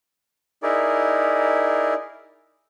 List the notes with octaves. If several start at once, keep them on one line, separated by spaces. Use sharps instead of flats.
D#4 E4 G#4 A#4 D5